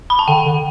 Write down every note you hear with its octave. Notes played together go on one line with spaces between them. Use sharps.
B5
A5
D3 G5
D3